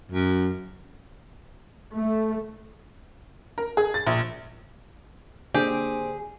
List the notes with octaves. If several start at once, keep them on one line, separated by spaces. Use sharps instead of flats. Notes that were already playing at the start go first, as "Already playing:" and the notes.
F#2
A3
A#4
G#4
A6
A#1
D3 A#3 C4 D4 G4 G#4